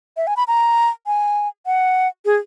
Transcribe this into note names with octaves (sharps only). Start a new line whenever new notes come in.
E5
G#5
B5
A#5
G#5
F#5
G#4